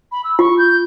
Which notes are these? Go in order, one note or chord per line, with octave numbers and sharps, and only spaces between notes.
B5
E6
F4 C#6
G6